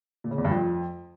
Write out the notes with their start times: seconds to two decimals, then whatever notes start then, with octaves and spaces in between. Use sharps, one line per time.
0.24 A#2
0.31 C#3
0.38 E2
0.45 G2
0.51 F2